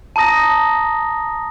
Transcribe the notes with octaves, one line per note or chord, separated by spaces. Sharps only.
A5 A#5 D#6 A#6